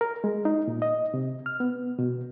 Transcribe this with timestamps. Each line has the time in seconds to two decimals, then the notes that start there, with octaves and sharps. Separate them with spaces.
0.01 A#4
0.24 G#3
0.45 D#4
0.68 A#2
0.82 D#5
1.14 C3
1.46 F6
1.60 B3
1.99 B2